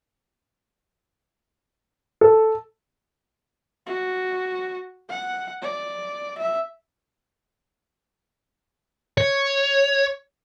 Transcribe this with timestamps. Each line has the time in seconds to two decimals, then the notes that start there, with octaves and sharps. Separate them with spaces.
2.21 A4
3.87 F#4
5.09 F#5
5.62 D5
6.38 E5
9.18 C#5